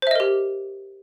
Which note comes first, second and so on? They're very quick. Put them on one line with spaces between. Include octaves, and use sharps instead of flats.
C5 E5 D#5 A#4 G4